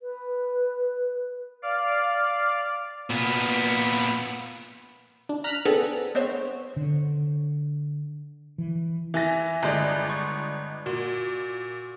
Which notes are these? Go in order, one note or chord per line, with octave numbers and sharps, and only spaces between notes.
B4
D5 F5
A#2 B3
D4
A#5 F6 F#6 B6
B3 C4 D4 G#4 A4
B3 C4 C5 C#5
D3
E3
E3 E5 G#5 A#6
G1 G#3 D5
C#6
A#2 F#4